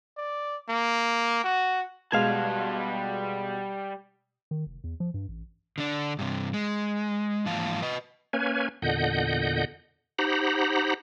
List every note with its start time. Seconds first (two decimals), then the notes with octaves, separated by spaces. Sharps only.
0.17 D5
0.69 A#3
1.44 F#4
2.12 B2 G3 G#3 F5 A5 G#6 F7
4.51 D#3
4.66 F1
4.84 E2
5.00 F3
5.14 G2
5.28 A1
5.78 D3 D4
6.19 G2 C3
6.54 G#3
7.46 G#2 E3 F3 A#3 F5 A5
7.82 B4 D#5
8.33 A#3 C#4 B4 C#5 G#5
8.82 E2 A#2 D3 D#5 F#5 G6
10.19 D#4 G4 C5 F#5 A#5 B5